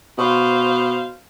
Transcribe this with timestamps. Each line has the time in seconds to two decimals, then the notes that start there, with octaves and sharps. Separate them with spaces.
0.18 B2 C5 F5